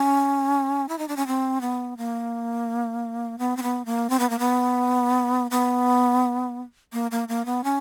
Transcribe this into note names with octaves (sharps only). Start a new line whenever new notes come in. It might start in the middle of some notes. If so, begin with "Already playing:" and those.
Already playing: C#4
E4
D#4
D4
C#4
C4
B3
A#3
B3
C4
B3
A#3
C4
B3
A#3
B3
B3
A#3
A#3
A#3
B3
C#4